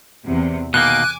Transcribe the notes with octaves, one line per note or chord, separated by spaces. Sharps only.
E2 C3
B2 D#3 A#3 G#5 D6 F#6